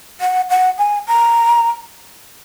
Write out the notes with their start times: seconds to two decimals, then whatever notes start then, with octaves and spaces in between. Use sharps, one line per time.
0.21 F#5
0.50 F#5
0.78 G#5
1.07 A#5